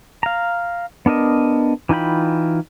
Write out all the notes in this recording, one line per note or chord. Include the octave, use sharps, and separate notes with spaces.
F5 A#5
B3 D4 A#4 D#5
E3 D#4 F4 G5 B5